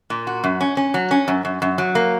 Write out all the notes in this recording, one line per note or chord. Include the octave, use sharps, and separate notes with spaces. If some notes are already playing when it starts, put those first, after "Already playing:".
A#2
F#4
F#2
C#4
C#4
F#3
C#4
F#2
F#2
F#2
F#3
A#3